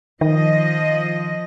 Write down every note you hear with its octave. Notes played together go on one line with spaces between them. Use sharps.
D#3 F3 D#5